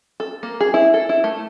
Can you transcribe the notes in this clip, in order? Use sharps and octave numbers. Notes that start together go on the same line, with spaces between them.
A4
A#3
G#4
E4
A4
E4
A3